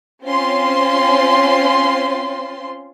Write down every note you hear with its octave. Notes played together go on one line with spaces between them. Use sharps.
C4 C#4 F4 C5 C6